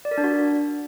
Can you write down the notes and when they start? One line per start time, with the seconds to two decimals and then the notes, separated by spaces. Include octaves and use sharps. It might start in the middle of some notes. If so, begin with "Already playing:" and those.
0.05 D5
0.11 A#4
0.18 D4
0.24 F#4